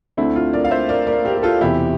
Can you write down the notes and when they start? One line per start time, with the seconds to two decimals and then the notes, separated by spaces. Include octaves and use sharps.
0.17 D2 D3 A3 C4 E4
0.36 F4
0.53 A#4 D5
0.64 F5
0.71 C5 E5
0.89 A#4 D5
1.07 A#4 D5
1.25 G4 A#4
1.35 G4
1.43 F4 A4
1.61 E1 E2 C3 E4 G4